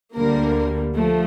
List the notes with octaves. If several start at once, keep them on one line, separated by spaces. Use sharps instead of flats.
D2 D3 G3 A#3 A#4
F3 A3